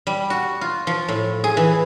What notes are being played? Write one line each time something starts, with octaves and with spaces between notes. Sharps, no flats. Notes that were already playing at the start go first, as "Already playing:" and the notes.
G3
F#4
F4
F3
A2
G#4
E3